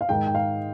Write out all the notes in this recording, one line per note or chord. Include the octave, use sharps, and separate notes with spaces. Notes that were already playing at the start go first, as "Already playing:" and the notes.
F5
G#2 D#3 G#3 D#4 G5
G5
F5